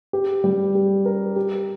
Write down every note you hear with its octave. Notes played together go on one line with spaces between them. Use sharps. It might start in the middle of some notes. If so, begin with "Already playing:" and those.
G4
G3
G4
A#4
G4